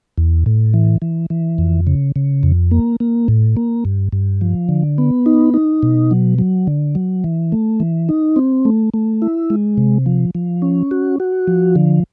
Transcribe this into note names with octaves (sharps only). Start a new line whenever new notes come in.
E2
A2
E3
E3
E3
F2
C#3
C#3
F2
A#3
A#3
A2
A#3
G2
G2
F3
D3
B3
D#4
D#4
B2
F#3
F#3
D3
F#3
E3
A3
E3
D#4
C4
A3
A3
E4
G#3
C3
F3
F3
C#4
F#4
F#4
F3
D3